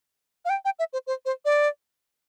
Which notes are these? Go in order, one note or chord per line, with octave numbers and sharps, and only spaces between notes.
F5
G5
G5
E5
C5
C5
C5
D5